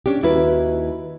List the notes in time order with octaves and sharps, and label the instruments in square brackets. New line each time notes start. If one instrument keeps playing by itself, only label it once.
[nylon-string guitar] C#4 D4 G4
D#2 E4 F#4 B4